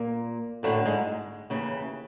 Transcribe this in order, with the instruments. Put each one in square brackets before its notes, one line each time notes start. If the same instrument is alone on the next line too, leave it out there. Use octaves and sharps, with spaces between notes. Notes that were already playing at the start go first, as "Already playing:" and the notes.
Already playing: [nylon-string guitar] A#2 A#3
F#2 A2 D3 A3
G#2 G#3
D#2 C#3 E3